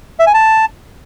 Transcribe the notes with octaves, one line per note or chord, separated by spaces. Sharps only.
E5
G#5
A5